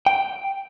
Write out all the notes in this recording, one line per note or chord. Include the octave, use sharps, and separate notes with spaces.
G5